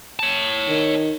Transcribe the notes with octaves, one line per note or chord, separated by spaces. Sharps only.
C#5 A5
D#3